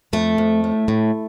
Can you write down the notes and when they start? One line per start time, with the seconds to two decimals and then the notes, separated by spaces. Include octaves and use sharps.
0.13 F2 A3
0.38 F2
0.64 A2
0.88 A2